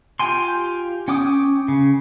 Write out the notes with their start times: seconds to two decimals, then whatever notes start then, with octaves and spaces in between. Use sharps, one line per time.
0.19 F4 G4 G5 G#5 C6
1.08 C#4 G5 D6 D#6
1.68 C#3